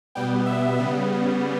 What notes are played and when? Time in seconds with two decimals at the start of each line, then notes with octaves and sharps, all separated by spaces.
0.15 B2 G3 B3 G5
0.46 E5
0.78 C#3 G3 B3